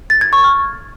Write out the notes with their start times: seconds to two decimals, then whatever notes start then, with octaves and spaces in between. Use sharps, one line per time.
0.10 A6
0.21 G#6
0.33 C#6
0.44 F6